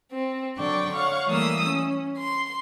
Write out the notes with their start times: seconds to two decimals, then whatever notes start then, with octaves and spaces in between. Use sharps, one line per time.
0.11 C4
0.56 D3 F#3 D5 G5 C#6
0.92 C#5 F5 F#5 C#6
1.27 E3 G3 A3 A#3 D#6 E6
1.67 C#4
2.16 C6